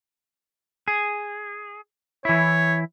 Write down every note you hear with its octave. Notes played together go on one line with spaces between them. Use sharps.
G#4
E3 E4 C#5